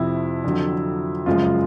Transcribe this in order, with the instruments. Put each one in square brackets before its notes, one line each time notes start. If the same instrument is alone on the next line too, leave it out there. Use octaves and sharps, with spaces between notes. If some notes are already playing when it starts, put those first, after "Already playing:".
Already playing: [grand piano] F2 C3 F3 E4
F2 D3 F#3
F#2 C#3 F3 G#3 F4